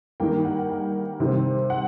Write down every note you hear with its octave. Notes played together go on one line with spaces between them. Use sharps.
D#3 G3 A#3 G5
F#5
G5
C3 D#3 G3 C4
F#5